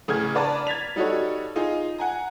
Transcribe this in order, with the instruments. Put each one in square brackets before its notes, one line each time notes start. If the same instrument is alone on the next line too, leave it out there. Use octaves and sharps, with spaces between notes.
[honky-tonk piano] A1 C#3 G#4 G#5 F6 G#6
D4 B4 D5 A5 A#5
G#6 A6 B6 F7
G3 D#4 F#4 A4 C#5
D#4 F4 G#4
F#5 G#5 A#5